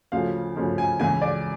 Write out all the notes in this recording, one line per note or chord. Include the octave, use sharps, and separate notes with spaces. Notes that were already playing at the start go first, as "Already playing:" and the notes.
D2 C#3 F3 F5
D2 C#3 F3
G#5
C#2 C#3 E3 G#5
D5